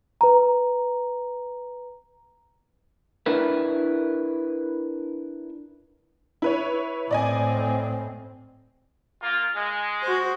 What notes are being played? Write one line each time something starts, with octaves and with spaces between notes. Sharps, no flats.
B4 A#5
D4 E4 A#4 B4
E4 B4 C#5
A2 C4 D5 D#5 G#5
A#3 F4
G#3
F#4 C5